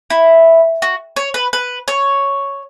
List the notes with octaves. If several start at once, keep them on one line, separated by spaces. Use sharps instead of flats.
E4
F#4
C#5
B4
B4
C#5